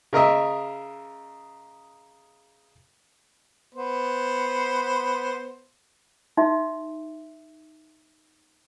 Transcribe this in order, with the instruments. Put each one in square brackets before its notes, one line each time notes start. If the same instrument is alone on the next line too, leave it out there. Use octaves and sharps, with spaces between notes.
[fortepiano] C#3 A#4 D#5 E5
[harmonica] B3 C5
[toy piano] D#4 F#4 E5